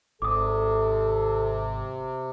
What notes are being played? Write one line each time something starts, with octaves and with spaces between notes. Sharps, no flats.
G#1 C3 A4 D6 D#6